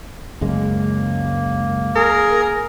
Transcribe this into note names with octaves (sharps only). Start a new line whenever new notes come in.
C#2 F#2 G#3 A#3
G#4 A#4